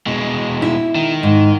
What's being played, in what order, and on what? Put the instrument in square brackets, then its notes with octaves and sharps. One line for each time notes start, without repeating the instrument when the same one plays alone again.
[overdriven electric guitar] B2 G#3
[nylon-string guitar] E4
[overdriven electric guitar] D#3
[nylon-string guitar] G#2